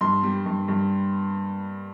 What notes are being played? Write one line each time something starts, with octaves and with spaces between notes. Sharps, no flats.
G2 C6
G3
G2
G2